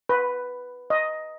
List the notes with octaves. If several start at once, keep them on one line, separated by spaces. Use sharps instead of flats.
B4
D#5